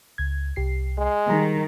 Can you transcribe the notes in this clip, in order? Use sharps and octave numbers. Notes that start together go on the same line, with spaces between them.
C#2 G#6
C2 G4 C7
G#3
D#3 G3 G#4 A#5